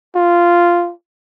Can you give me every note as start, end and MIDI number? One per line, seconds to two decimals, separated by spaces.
0.16 0.92 65